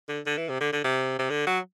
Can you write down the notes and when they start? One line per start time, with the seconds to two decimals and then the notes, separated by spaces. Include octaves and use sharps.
0.08 D3
0.26 D3
0.38 E3
0.49 C3
0.61 D3
0.72 D3
0.84 C3
1.19 C3
1.30 D3
1.47 F#3